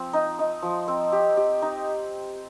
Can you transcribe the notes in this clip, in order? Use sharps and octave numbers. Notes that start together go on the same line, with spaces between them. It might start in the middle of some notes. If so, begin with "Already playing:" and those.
Already playing: F3 C4
D#4
D#4
F3
C4
G4
G4
D#4